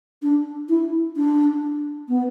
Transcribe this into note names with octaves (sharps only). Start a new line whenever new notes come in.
D4
E4
D4
B3